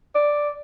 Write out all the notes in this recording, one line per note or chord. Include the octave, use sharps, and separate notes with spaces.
D5